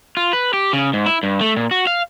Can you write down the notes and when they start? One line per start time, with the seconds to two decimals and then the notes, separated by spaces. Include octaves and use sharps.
0.17 F4
0.33 B4
0.53 G4
0.73 C#3
0.93 G#2
1.06 E4
1.23 G2
1.41 A3
1.57 A#2
1.71 F#4
1.87 F5